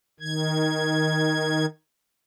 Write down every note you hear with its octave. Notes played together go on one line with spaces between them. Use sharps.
D#3 G#6